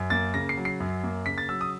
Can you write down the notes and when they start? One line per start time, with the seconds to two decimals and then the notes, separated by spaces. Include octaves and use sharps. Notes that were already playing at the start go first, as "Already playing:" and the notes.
Already playing: F#2
0.10 A#3 A6
0.34 C#3 A#6
0.49 C7
0.57 F#3
0.65 C7
0.80 F#2
1.04 A#3
1.26 C#3 B6
1.38 A6
1.49 F#3 E6
1.61 D#6